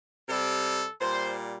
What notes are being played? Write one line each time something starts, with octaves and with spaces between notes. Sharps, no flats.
C3 G3 A4
A#2 G3 C5